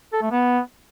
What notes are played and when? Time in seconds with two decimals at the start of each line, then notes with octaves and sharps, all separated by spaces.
0.13 A4
0.22 A3
0.31 B3